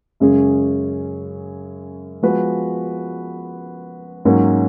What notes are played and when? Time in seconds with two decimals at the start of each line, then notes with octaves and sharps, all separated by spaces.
0.20 F#2 C#3 G#3 C#4 G#4
2.22 F3 G#3 B3 F#4 B4
4.25 G#2 F#3 A#3 C#4 F#4